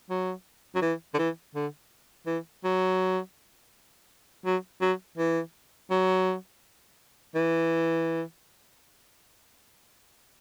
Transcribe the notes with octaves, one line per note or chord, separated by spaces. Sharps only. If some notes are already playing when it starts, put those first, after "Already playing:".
F#3
F#3
E3
D3
E3
D3
E3
F#3
F#3
F#3
E3
F#3
E3